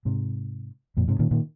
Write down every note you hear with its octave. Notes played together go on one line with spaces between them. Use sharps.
G#2 C3
F2 A#2
G#2 C3
A#2 D#3
A#2 D#3